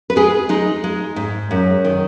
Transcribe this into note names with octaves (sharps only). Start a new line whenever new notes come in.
B4
G#3 G#4
G#3 D#4
G#3
G#2
F#2
D#3